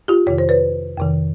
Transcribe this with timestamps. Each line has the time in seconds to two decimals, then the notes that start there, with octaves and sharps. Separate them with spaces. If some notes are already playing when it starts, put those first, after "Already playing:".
0.08 F4 G4
0.27 F2 C3 D#3 C#5
0.38 C5
0.49 B4 C#5
0.98 F2 C3 D#3